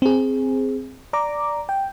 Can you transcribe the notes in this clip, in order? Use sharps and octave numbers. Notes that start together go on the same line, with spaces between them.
C4 G#4
D5 A#5 D6
G5